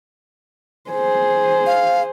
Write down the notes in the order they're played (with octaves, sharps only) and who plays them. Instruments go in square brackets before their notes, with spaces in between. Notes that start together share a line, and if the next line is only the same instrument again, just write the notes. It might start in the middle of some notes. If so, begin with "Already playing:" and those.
[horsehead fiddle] G#4 C5
[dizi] F5